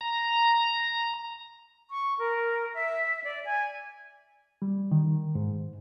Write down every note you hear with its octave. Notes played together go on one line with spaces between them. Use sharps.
A#5
C#6
A#4
E5
D5
G#5
G3
D#3
G#2